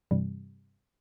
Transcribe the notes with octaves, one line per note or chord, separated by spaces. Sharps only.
G2 C3 E3 G3